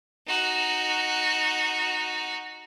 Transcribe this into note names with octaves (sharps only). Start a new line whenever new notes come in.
D#4 F#4